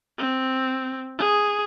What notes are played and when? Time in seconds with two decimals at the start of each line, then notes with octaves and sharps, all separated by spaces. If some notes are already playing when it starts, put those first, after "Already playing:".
0.18 C4
1.18 G#4